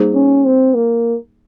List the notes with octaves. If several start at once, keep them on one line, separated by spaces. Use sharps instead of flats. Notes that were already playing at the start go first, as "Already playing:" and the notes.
Already playing: G3 A#3 D#4 G#4 C5
C#4
C4
A#3